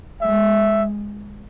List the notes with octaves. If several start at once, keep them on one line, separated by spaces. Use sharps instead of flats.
G#3 E5